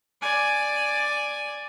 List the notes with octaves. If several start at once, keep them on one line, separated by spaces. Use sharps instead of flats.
D5 G#5